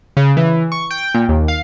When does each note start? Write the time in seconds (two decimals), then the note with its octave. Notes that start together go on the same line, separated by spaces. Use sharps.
0.17 C#3
0.37 E3
0.72 C#6
0.91 G5
1.14 A#2
1.29 D#2
1.48 F5